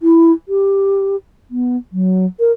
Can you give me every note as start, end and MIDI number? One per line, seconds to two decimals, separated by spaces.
0.01 0.32 64
0.48 1.16 67
1.51 1.77 59
1.92 2.26 54
2.40 2.52 70